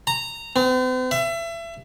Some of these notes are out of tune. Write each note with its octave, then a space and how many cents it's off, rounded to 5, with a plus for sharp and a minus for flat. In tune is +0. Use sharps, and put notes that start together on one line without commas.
A#5 -15
C4 -45
E5 +30